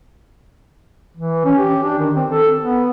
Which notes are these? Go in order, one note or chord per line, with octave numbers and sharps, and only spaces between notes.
E3
C#4
G4
D4
D#3
C4
A4
B3